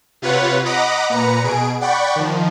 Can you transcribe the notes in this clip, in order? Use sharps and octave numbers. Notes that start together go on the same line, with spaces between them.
C3 F4 B4 C#5 F#5
D#5 F#5 A#5 B5 D6 D#6
A#2 B4 A#5 C#7
B2 G#4 D7
D5 F#5 G5 B5 C#6
D#3 F3